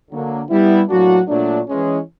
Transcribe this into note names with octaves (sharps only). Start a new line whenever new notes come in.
D3 F#3 A#3
G3 B3 E4
A2 F#3 A#3 D4 F#4
A#2 F#3 A3 D4
E3 G#3 C#4